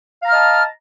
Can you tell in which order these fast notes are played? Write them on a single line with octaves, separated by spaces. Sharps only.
F5 A#5 F6 D#5 A5